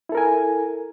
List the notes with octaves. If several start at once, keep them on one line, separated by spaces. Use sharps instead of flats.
E4 A4 A#4 G#5